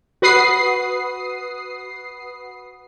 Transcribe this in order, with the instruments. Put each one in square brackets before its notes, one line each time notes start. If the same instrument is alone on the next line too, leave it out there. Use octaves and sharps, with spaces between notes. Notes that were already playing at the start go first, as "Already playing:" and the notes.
[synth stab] F#4 B4 D#6 C7